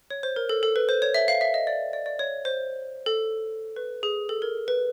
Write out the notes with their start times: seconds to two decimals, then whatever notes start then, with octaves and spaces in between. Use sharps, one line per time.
0.10 C#5
0.23 C5
0.36 A#4
0.49 A4
0.63 A4
0.76 B4
0.89 C5
1.02 C#5
1.14 E5
1.28 F5
1.41 E5
1.54 D#5
1.67 D5
1.93 D5
2.06 D5
2.19 C#5
2.45 C5
3.06 A4
3.76 B4
4.03 G#4
4.29 A4
4.42 A#4
4.68 B4